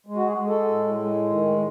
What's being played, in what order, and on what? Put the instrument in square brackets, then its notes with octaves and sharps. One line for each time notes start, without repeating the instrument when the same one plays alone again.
[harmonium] G#3
F#4
G#4
G#3
A4
A2
G#3
D#3